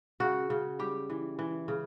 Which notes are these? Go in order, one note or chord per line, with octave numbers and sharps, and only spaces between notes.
C#3 F#4
C#3
G3 G4
E3
E3
C#3